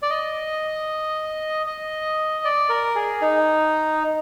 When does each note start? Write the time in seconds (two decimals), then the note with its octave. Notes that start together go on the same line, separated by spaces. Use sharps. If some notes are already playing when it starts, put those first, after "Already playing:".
0.02 D5
0.10 D#5
1.66 D#5
2.45 D5
2.69 A#4
2.95 G#4
3.22 D#4